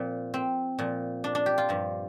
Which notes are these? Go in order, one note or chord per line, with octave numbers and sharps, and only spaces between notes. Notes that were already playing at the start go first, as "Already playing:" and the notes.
Already playing: A#2 F3 C4
C4
A#2 F3
D4
D4
G4
F4
G2 F3